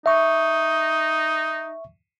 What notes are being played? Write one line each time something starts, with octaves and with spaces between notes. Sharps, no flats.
D#4 E5 C#6